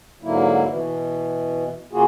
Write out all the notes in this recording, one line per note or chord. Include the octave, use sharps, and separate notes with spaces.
G#2 D3 F#3 A#3 E4
B2 E3
C#3 A#3 F4 F#4 G#4